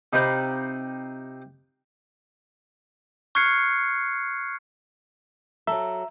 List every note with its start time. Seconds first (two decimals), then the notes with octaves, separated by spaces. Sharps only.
0.13 C3 D#4 F4 C5 B5 D#6
3.35 C#6 F6 F#6 G#6 C7 C#7
5.67 F#3 A4 E5 A#5